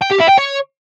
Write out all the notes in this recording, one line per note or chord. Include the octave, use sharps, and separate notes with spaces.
G5
G4
E4
G5
C#5